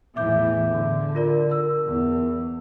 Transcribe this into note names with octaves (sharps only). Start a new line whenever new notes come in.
E2 A2 E3 E5 D6 G6
D3
F4 A#4 D5
A#4 E6
E2